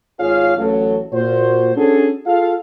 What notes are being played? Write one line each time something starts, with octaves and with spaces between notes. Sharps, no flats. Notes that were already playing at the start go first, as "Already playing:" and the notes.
G#1 F4 G#4 C#5 F5
A1 F#3 A4
A#2 F#4 C5
C#4 D4 F#4 G#4 A4
F4 G#4 A4 F5